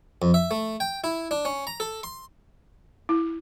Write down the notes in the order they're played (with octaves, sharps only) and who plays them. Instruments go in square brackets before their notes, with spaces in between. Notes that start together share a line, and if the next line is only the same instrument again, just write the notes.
[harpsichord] F2
E5
A3
G5
E4
D4
C#4
A#5
A4
C6
[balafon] E4